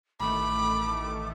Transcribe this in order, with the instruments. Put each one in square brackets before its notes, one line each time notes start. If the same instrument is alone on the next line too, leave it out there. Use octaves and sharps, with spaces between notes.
[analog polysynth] A1 D#3 A3 [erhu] B5 [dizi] D6